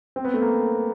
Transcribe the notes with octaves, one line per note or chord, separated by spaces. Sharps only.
C4
B3
A3
A#3